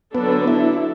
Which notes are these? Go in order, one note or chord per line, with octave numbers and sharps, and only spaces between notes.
D3 F#3 B3 D4 A4
E4